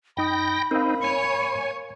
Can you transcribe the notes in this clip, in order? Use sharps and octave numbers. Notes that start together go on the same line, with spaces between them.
F#2 D#4 G5 B5 D#6 A#6
C4 D#4 A#4 F5
C#5 G#5